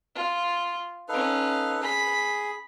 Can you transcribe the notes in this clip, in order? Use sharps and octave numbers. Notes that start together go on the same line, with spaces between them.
F4
C#4 D#4 A4 B4 F5
G#4 B5